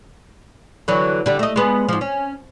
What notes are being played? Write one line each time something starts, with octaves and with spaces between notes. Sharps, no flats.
D3 E3 F#3
D3 G3
A3 D#5
G#3 B3
G#2 F3
C#4